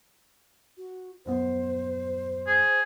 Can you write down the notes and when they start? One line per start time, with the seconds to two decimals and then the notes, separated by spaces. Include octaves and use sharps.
0.77 F#4
1.26 D#1 F#2 B3 C5
2.47 G#4